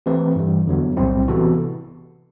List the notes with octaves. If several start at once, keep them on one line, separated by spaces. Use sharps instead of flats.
E3 A3 C4 G4 B4
G2 E3 G3
E2 D3 F#3 B3
B1 A2 G3 C4 E4
C3 E3 B3 F#4 A4